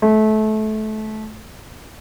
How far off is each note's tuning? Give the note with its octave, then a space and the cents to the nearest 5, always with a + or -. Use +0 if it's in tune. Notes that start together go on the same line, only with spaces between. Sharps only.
A3 -25